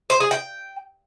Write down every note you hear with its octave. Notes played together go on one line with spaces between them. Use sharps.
C5
G#4
G5